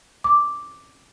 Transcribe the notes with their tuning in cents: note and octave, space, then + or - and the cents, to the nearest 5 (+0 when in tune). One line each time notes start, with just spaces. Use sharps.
D6 +0